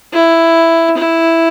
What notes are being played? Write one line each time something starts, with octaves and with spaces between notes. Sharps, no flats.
E4
E4